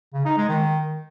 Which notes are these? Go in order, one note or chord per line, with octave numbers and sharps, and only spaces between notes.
C#3
D#4
G#3
D#3